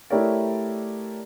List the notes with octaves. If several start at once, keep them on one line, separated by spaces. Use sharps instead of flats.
A3 E4 G4 A#4 C#5 D5